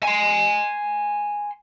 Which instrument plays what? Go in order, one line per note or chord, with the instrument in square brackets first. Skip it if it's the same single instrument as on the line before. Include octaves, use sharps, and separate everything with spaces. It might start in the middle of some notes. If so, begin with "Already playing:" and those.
[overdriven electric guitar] G#5 C6